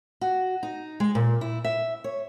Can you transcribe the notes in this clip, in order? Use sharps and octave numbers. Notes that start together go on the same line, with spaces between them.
F#4
D#4
G#3
A#2
E4
E5
C#5